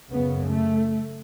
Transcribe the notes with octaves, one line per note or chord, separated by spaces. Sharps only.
F#2 C#3 B3
A3